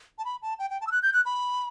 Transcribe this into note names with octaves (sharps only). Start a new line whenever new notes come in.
A5
B5
A5
G5
G5
A5
E6
F#6
G6
F#6
B5